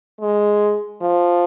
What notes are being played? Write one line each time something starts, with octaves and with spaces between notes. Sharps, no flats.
G#3
F3